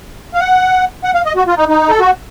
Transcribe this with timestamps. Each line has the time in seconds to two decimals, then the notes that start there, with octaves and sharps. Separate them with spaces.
0.34 F5
0.40 F#5
1.04 F#5
1.14 F5
1.25 D#5
1.36 F#4
1.47 F4
1.57 D#4
1.69 D#4
1.90 A4
2.00 F#4